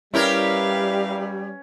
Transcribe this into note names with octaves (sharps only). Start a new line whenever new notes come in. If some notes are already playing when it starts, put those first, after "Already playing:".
G3 C#4 E4 G4 A#4 B4 F5